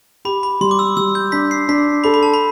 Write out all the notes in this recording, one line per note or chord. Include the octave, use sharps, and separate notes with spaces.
G4 B5
B5
G3 C6
D6
E6
G3 E6
G6
D4 B6
C7
D4 B6
A4 B5
B5
A5
B5